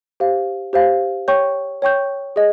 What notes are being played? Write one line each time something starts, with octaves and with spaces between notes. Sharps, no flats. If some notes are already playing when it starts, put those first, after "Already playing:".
G4 C5 F5
G4 C5 F5
C#5 G5 C#6 G6
C#5 G5 C#6 G6
G#4 D#5